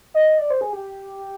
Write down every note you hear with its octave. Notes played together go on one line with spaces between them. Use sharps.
D#5
D5
C5
G#4
G4